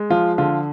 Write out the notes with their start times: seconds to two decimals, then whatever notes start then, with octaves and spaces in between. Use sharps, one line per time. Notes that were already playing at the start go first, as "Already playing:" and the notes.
Already playing: G#3
0.10 F3 F4
0.38 D3 F4